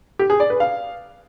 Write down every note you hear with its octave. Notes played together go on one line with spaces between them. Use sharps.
G4
G#4
D5
B4
F5